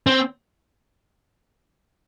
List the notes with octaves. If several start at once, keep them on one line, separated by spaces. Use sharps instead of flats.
C4